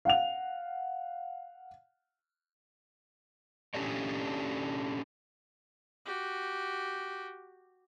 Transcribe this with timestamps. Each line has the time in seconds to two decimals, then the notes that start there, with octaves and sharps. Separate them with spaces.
0.05 F5 F#5 F7
3.74 C#4 D4 G4 A4 C#5 D5
6.05 F#4 G4